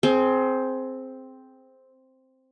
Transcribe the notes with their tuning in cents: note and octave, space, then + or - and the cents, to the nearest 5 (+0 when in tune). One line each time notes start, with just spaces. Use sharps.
C4 +0 G#4 +25